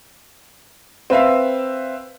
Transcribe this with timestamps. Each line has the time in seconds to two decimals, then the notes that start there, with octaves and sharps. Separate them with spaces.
1.10 C4 B4 E5 F5